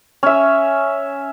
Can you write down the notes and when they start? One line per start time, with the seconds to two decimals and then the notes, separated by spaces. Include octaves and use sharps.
0.23 C#4 E5